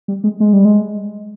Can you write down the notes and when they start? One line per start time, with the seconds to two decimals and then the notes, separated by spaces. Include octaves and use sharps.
0.08 G3
0.24 G#3
0.40 G#3
0.53 G3
0.65 G#3